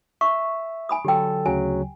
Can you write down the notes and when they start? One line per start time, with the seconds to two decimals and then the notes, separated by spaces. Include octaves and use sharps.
0.21 E5 C#6
0.89 G#5 B5 D#6
1.05 D3 F#3 G4 A4 G5
1.46 D2 C#3 F#3 G#5